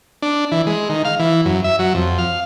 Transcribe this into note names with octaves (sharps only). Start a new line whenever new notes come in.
D4
E3
G#3
D#3
F5
E3
F#2
E5
F#3
F2
F5